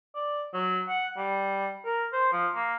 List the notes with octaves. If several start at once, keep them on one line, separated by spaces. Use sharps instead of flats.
D5
F#3
F#5
G3
A#4
C5
F3
A#3